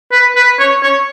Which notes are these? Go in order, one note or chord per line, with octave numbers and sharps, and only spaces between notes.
B4
B4
C#5
C#5